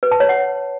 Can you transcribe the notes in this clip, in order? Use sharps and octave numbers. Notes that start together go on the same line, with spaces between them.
B4
A5
C#5
F#5